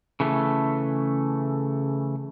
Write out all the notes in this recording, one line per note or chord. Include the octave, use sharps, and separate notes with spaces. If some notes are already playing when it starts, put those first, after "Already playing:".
C#3 E3 A3